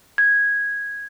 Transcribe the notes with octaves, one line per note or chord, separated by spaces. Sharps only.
G#6